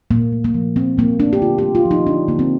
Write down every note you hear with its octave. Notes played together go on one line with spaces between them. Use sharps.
A#2 A#3
A3
A#3
F3
A#2 C4
A#2 A#3
A3 D4
G4
D3 F4
A3 G4
F4
F3
D#4
D3 D4
D3 A#3
C4